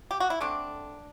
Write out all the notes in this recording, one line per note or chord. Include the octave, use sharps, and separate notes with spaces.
G4
F#4
E4
D3 A3 C4 D4